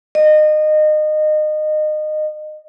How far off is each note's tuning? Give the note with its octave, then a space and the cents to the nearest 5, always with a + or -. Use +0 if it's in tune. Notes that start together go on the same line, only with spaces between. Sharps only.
D#5 -25